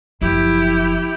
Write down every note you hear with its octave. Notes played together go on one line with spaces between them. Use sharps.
F#1 F3 E4 G4